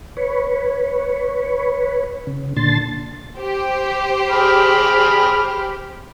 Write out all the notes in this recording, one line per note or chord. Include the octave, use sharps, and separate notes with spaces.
B4 C#5
C#3
A#2 D3 A5 C6 A6
G4 C5
G#4 B5 F6